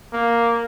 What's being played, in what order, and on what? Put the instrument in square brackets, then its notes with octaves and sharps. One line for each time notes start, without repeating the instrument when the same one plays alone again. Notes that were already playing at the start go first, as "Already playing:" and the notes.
[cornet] A#3